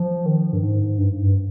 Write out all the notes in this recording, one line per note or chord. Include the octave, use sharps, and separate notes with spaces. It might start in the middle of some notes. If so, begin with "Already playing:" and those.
Already playing: F3
D#3
G2
G#2
G2
G2